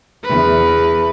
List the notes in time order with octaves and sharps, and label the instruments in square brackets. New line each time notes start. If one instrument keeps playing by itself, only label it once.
[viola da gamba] E2 B4